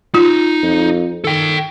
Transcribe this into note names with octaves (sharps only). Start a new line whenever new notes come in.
D#4 F4
F2
D#3 A4 G5